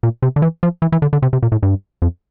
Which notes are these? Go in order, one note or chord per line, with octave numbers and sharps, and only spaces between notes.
A#2
C3
D3
E3
F3
E3
E3
D3
D3
C3
C3
A#2
A2
G2
F2